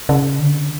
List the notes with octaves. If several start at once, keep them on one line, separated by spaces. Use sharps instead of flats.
C#3
D3